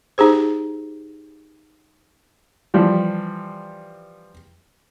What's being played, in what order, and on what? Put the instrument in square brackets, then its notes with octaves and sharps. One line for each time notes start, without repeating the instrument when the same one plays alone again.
[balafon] D#4 G4 G#4 C5
[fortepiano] E3 F3 G3